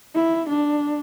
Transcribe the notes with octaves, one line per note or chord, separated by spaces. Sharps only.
E4
D4